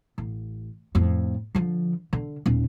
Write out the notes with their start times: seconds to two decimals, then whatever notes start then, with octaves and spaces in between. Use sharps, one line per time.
0.18 A1
0.95 F2 A2
1.55 D3 F3
2.13 D3
2.46 D#1 C#4